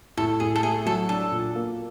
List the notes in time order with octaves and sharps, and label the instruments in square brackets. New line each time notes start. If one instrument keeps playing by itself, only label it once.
[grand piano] A2 [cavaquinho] A4
[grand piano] A2 [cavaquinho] G#4
[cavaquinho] A4
[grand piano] A3 [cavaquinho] G#4
[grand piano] F#3 [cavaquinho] A4
[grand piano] D4 [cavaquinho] A4
[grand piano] A#2
A#3